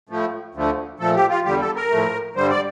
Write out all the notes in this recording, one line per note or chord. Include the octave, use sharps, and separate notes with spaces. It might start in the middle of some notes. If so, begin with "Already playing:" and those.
A2 F3 A3
D2 D3 F3 A3
A#2 F3 A3 A4
G4
F4
E2 D3 G3 G4
A4
A#4
A2 F3 A3
G2 D3 G3 C5
D5